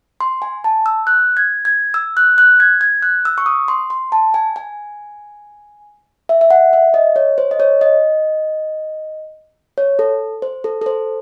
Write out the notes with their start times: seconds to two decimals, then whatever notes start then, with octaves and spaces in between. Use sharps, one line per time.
0.21 C6
0.42 G#5
0.64 A5
0.86 E6
1.07 F#6
1.37 G#6
1.65 G#6
1.94 E6
2.17 F#6
2.38 F#6
2.60 G#6
2.81 G#6
3.03 F#6
3.25 E6
3.38 C#6
3.46 D#6
3.68 C6
3.90 C6
4.12 A5
4.34 G#5
4.56 G#5
6.29 E5
6.41 E5
6.51 F#5
6.73 E5
6.94 D#5
7.16 C#5
7.38 C5
7.51 D#5
7.60 C#5
7.81 D#5
9.78 C#5
9.99 A4
10.42 C5
10.64 A4
10.81 A4
10.86 C5